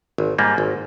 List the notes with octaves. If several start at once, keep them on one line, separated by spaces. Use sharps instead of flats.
G#1
G#2 G3 A#3
G#1